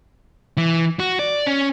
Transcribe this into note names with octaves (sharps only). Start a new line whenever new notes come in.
E3
F#4
D5
C#4